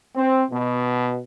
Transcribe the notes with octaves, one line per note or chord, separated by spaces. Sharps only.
C4
B2